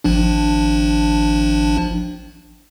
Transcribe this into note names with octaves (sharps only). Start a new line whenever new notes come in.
G#1 F3 D4